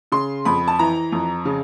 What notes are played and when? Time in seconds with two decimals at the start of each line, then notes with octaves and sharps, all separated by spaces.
0.12 C#3 C6
0.45 F2 B5
0.67 A5
0.79 E3 A#5
1.12 F2
1.45 C#3